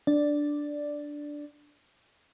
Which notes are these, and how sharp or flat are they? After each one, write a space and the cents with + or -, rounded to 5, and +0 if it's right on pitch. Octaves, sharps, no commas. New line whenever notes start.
D4 +0 D5 +0